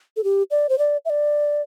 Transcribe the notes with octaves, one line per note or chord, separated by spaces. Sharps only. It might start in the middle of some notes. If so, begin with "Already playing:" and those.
A4
G4
D5
C5
D5
E5
D5